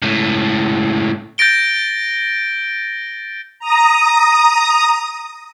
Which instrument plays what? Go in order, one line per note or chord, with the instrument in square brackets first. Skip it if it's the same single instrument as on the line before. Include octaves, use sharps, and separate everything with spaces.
[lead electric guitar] C#2 A2
[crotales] G6 A6 A#6 D7 G7
[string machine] A#5 D#6